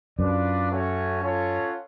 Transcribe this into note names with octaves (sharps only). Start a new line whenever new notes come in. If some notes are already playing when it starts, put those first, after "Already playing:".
F#2 D4 F4 B4 D5
A3 C#4 F#4 C#5
C#4 F4 A4 C#5 F#5